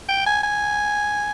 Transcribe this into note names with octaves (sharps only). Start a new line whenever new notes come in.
G5
G#5
G#5